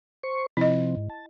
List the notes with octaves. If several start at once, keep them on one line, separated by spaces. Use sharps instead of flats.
C5 C#6
C3 F3 C4 E4 D#5
G#2
A5